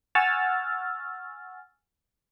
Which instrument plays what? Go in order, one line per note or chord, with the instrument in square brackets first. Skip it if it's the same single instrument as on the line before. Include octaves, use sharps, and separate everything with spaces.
[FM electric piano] F#5 G#5 C#6 E6 F6 A6